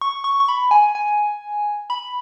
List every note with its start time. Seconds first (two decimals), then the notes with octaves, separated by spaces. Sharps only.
0.01 C#6
0.24 C#6
0.40 C#6
0.49 B5
0.71 G#5
0.95 G#5
1.90 B5